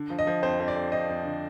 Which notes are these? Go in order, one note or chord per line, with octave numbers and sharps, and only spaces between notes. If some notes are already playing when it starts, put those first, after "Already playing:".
Already playing: D3
F3
D#5
F3
F2 C5
F2
D5
F2
F2 D#5
F2
D3